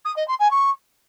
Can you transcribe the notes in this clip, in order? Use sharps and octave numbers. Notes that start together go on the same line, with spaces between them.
D#6
D#5
C6
G#5
C#6